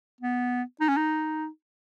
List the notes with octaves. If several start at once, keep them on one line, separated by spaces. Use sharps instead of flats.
B3
D#4
C#4
D#4